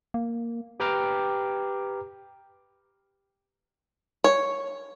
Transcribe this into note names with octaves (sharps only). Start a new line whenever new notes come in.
A#3
G4 B4 G5 A#5 D6 F6
C#5